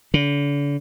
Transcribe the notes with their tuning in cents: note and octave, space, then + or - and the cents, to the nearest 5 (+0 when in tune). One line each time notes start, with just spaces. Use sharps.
D3 -40